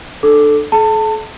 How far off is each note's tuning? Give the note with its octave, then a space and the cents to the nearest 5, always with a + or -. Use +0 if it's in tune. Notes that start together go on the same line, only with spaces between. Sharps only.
D4 +30 A4 +0 D6 +0
A4 -45 A5 +30